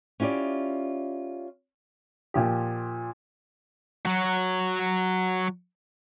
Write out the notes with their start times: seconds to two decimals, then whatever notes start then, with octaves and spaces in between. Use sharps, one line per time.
0.20 C#4 E4 F4 G4 D5
2.34 A#2 F3 G4
4.06 F#3 F#4